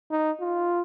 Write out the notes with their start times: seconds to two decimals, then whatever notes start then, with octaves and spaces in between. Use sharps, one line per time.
0.11 D#4
0.40 F4